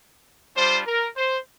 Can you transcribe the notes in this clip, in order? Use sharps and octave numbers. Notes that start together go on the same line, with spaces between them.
G3 D4 F4 C5
A#4
C5